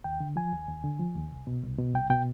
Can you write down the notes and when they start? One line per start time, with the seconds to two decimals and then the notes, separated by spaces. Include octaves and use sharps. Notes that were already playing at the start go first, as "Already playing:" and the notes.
0.04 D#2 G5
0.20 D3
0.36 F3 G#5
0.52 D#2
0.69 D#2
0.84 D3
0.99 F3
1.16 D#2
1.31 C2
1.47 B2
1.63 C2
1.79 B2
1.95 C2 G5
2.10 B2 G5